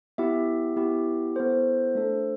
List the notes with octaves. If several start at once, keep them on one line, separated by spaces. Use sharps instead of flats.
B3 E4 G4 E5
B3 E4 G4
B3 E4 A4 C5
A3 D4 A4